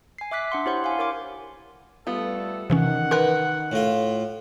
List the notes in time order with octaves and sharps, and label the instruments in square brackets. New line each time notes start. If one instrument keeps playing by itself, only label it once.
[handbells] G#5 C7
E5 D6 F#6 B6
D4 F#5 C6
E4 G4 C5 C#5 F#5 C6
F5 G#5
E4 A#4 C#5 C6 D6
[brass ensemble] G3 A3 A4 [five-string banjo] B3 F4
[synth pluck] C3 E3 C#4 [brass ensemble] D#3 F#5
[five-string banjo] A#4 B4 [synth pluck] C6 F#6
[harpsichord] A2 F4